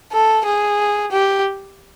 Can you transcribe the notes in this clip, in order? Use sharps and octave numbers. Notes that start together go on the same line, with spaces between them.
A4
G#4
G4